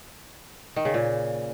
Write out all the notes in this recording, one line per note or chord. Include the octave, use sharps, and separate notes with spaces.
D#3
C#3
A#2